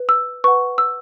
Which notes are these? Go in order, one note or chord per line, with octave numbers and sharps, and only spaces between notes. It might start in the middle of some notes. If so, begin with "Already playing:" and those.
Already playing: B4
E6
B4 F#5 C#6
E6